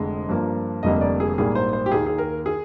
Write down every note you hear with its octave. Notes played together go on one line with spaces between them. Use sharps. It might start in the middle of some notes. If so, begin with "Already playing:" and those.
Already playing: F1 F2 D3 G#3
G2 F3 A#3
F1 F2 D3 G3 A#3 D#5
D5
G#4
A#1 G#2 G3 A#3 G#4
C5
C5
G4
D#2 D#3 A#3 G#4
G#4
A#4
G#4